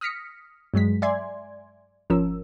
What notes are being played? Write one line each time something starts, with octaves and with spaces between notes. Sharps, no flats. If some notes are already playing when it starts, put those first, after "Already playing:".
D#6 F6 A#6 B6 C#7
G2 F#3 G#3 B6
D5 E5 G#5 C6 G#6
G#1 F3 C#4 A#4 E6